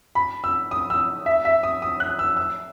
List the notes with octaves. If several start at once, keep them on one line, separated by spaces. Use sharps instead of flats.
B5
E6
D#6
E6
E5
E5
D#6
D#6
F#6
E6
E6